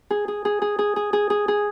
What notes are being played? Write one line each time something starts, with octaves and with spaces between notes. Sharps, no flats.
G#4
G#4
G#4
G#4
G#4
G#4
G#4
G#4
G#4